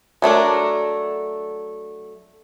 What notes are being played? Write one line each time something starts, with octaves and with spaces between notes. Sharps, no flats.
F#3 A3 D4 A#4